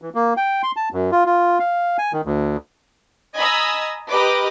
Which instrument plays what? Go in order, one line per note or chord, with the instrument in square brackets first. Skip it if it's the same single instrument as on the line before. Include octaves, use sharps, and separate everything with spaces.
[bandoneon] E3
A#3
G5
C6
A5
F#2
F4
F4
F5
G#5
D#3
D2
[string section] D#5 G#5 A#5 B5 D#6 E6
G4 A#4 B4 D#5 B5 D6